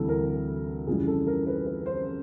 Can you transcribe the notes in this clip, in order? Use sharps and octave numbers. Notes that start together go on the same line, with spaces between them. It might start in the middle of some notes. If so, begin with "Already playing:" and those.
Already playing: D2 C3 E3 G3 A4
A#4
F2 C#3 E3 G3 G#4
A4
A#4
B4
B4
C5